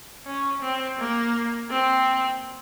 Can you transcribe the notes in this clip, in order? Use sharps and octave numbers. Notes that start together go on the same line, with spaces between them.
C#4
C4
A#3
C4